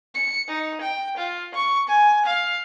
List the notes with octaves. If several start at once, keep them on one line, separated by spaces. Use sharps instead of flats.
C#7
D#4
G5
F4
C#6
G#5
F5